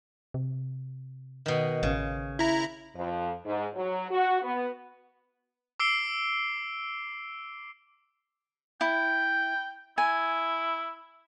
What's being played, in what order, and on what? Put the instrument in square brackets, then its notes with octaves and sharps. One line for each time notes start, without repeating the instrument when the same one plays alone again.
[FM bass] C3
[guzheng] B2 D#3
[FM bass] A1 [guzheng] C#3
[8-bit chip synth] E4 A#5
[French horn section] F2
G#2
F#3
F#4
B3
[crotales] D6 E6 C7 D7 G7
[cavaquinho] E4 [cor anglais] G5
[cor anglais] E4 [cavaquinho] G#5